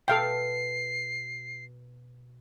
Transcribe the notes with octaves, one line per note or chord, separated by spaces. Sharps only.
B2 A4 F5 G5 C7